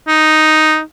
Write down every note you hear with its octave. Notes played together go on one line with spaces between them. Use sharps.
D#4